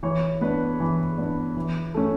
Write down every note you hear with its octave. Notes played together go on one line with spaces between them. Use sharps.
E3 C#5
B3 D4 B4
E3
B3 D4
E3
A3 C#4